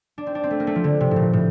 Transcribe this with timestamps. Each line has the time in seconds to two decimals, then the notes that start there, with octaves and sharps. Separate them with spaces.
0.18 D4
0.27 C4
0.35 D4
0.44 C4
0.51 A3
0.60 A#3
0.67 A3
0.75 F3
0.84 D3
1.01 C3
1.11 A2
1.16 A#2
1.33 A2